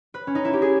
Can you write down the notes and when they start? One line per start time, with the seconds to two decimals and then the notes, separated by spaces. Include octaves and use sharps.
0.14 B4
0.27 C#4
0.35 D#4
0.45 E4
0.53 G4
0.62 G#4